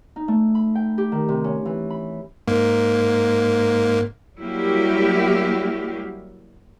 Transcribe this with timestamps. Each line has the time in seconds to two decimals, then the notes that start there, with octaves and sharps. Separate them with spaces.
0.16 D#4
0.28 A3
0.55 B5
0.75 G5
0.98 G4
1.12 D#3
1.29 C3
1.44 C#4
1.65 E3
1.90 B5
2.48 G#2 A#3
4.39 F#3 G3 A#3 E4 F#4 G4